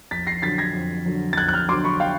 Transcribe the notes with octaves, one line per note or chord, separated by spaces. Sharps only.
F2 A6 B6
A#6 C7
D3 F#3 A6 B6
G#6 A#6
F2
D3 F#3
A6
F2 F#6 G#6
F#6
F6 G6
D3 F#3 C6 D6
B5 C#6
F5 G5